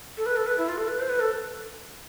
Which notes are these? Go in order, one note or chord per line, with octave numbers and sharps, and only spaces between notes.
A4
B4
A4
B4
E4
F4
A4
B4
C5
B4
A4